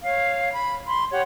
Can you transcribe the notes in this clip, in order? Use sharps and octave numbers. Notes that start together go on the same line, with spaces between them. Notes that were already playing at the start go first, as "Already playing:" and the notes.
C#5 F5
B5
B5 C6
G4 C#5 F#5